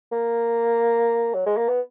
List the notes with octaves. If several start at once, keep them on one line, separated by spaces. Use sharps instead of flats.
A#3
F#3
G#3
A#3
B3